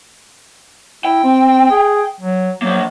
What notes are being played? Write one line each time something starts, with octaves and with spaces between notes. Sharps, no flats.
E4 G5
C4
G#4
F#3
F3 F#3 A#3